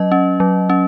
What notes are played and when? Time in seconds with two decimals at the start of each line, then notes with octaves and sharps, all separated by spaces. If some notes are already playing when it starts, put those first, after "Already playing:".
Already playing: F#3 C#4 D#5
0.12 C#4
0.40 F#3
0.70 C#4